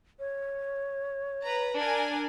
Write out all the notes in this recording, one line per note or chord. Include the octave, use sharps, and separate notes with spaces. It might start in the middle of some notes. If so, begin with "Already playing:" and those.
C#5
B4 A#5
D4 A#4 G#5